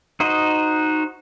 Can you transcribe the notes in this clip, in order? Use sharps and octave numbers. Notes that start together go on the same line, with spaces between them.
D#4 F#4 C5 D#5